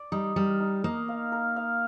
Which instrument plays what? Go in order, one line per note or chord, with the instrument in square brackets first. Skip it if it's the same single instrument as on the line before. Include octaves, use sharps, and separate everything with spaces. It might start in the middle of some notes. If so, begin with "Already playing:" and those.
Already playing: [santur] D5
[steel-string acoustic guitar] G3 [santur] D#4
[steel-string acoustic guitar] G3 [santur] A#4
[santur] D#4
[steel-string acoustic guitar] A#3 [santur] D#4
[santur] F5
A#4
F5